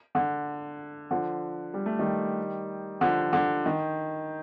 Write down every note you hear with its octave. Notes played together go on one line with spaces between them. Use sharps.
D3
D3 F3
G3
A3
D#3 G3
D3 F3
D3
D#3